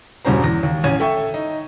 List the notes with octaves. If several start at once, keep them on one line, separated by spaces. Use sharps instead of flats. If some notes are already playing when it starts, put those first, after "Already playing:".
E1 G2 B2 C#4 C5 A#5
E2 A#6
D#2
A1 C#4 G#6 D#7
A4 E5 G5 C#6
D#4